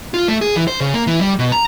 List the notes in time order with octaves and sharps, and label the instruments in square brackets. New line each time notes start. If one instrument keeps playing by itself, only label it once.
[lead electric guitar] F4
A3
G#4
E3
C5
C#3
A#3
E3
G3
B2
A#5